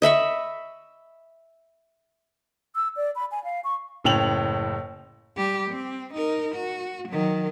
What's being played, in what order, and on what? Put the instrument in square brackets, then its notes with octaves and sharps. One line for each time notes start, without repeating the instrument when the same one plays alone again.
[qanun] D#5 E5 B5 C#6
[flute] E6
D5
B5
G#5
F5
C#6
[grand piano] F#1 A2 G5 F7 F#7
[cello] G3 G4
C4
D#4 A#4
F#4
D#3 F#3